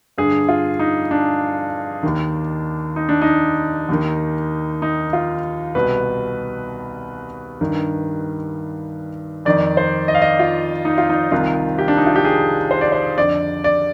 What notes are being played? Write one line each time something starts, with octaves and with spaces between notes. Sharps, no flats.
G2 D3 G#4
F4
D#4
D4
D#2 D#3
D#4
D4
D#4
D#2 D#3
D#4
F4
C2 B2 B4
G2 D#3
F2 D#3 D5
C5
D#5
F5
D#5
F4
D#4
F4
D#4
C2 C3 D#3 F4
G4
D4
D#4
F4
G4
G#4
C5
D5
C5
F2 D3 D5
D5